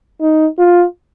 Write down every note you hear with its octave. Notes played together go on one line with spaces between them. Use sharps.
D#4
F4